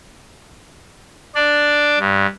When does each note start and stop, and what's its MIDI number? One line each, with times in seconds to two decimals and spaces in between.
1.35 1.99 62
1.35 1.99 74
1.99 2.26 43